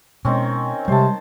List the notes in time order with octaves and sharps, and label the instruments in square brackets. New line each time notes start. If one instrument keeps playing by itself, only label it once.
[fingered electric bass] B2 G#3 [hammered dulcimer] D#3 C4 C#4
[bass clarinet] C3 [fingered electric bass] G3 G#3 [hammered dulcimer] C5 A5